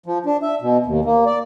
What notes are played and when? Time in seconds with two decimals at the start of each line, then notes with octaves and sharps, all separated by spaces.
0.06 F3
0.26 D4
0.42 E5
0.62 B2
0.86 D#2
1.05 A#3
1.26 D5